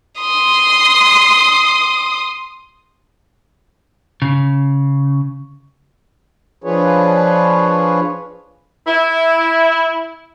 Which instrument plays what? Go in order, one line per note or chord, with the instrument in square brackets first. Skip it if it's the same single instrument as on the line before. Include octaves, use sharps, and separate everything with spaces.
[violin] C6 D#6
[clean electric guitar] C#3
[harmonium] F3 D4 F4 G#4 B4 C#5
[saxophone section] E4